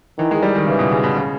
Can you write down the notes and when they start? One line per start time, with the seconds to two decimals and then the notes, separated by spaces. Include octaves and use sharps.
0.18 D#3 E3
0.31 G#3
0.43 G3
0.55 D#3
0.66 C#3 E3
0.79 B2
0.91 C#3
1.04 B2
1.16 C#3